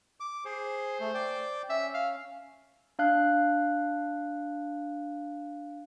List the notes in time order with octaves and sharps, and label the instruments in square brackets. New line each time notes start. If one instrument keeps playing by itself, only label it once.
[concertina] D6
[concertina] G#4 [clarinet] C5
[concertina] A3
D5 G5
[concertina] C#4 [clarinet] E5
[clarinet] F5
[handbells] D4 F5 F#6